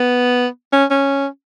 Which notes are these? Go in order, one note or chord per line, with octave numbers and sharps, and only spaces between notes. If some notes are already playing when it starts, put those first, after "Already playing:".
Already playing: B3
C#4
C#4